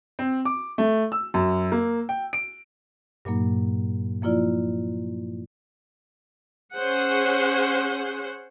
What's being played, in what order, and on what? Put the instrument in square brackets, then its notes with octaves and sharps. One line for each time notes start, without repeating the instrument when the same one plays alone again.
[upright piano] C4
D6
A3
E6
F#2
A#3
G5
D7
[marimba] G2 A#2 F#3 A#3 D#4
F3 A#3 E4 F4 D5
[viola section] C#4 G#4 C5 F#5